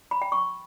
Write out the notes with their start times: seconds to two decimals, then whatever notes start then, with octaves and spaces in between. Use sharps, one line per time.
0.11 B5
0.22 G5
0.32 C#6